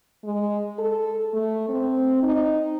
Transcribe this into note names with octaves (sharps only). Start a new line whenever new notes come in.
G#3
A4
A3
C4
D#4